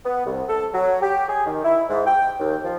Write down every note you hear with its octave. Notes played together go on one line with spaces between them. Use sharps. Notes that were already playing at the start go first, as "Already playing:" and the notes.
B3
C2
A4
F#3
G4
G#4
D#3
E4
G#2
G5
D#2
F3